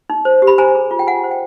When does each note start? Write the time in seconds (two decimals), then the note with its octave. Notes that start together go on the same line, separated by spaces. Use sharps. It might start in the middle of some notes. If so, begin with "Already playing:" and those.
0.10 D#4
0.25 C5
0.42 G4
0.47 B5
0.58 C5 G#5 A#5
0.75 G#4
0.91 F4
0.99 G5
1.07 F4 F#5 G#5
1.24 C5
1.31 G5